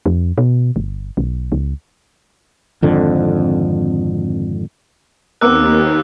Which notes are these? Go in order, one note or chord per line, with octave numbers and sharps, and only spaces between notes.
F2
B2
G1
B1
C#2
G#1 F2 D3
D#2 B3 C4 A#4 D6 E6 F#6